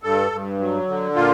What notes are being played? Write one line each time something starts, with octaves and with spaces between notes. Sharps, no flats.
G2 A4
G2
F#3
D3
A#2 F4